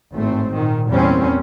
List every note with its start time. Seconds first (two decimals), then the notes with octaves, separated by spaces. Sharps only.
0.12 G#1 A2 A3 C4
0.54 A#2 D#3
0.89 E2 G3 A#3 C4 C#4